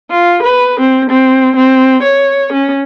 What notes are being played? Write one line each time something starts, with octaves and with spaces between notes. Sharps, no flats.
F4
B4
C4
C4
C4
C#5
C#4